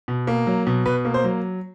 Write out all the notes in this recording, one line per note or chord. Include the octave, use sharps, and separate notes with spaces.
B2
A#3
F#3
B2
B2 B4
A#3
C5
F#3